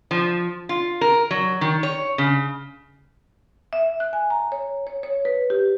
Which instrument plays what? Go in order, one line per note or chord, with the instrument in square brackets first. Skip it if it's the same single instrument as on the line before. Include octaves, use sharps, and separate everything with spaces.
[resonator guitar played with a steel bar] F3
F4
A#4
F#3
D#3
C#5
C#3
[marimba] E5
F#6
G#5
A#5
C#5
C#5
C#5
B4
G4